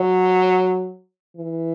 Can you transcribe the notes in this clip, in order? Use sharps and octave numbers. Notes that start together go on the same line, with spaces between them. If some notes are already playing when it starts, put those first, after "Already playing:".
Already playing: F#3
E3